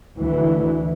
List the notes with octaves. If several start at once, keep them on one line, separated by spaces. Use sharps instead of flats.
D2 E3